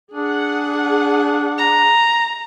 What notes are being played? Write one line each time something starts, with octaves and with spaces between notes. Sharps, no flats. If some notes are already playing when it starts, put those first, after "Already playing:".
D4 G#4 F#5
A#5